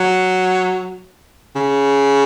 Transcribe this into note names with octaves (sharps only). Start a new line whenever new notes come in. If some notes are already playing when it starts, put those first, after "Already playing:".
Already playing: F#3
C#3